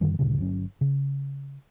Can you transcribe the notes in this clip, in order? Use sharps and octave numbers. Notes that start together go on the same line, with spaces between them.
F#2 D3 D#3 G3
D2 G2 A#2 C#3
G1 F#3 C#4
C#3